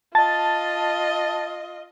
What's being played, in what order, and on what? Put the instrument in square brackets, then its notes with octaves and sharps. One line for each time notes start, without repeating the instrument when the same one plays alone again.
[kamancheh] F4 D#5 [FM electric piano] A5 A6